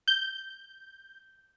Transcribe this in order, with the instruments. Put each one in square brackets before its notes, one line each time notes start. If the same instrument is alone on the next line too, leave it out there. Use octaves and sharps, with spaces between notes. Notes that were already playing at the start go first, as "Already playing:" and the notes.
[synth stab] G6